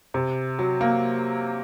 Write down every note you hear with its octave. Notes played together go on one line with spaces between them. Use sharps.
C3
F#3
A#3